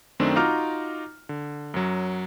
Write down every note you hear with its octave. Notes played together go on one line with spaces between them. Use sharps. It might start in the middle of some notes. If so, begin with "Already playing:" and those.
F#2 D#3 A3 C4 D4
D#4 F4 F#4 A#5 D6 F6
D3
F#2 F#3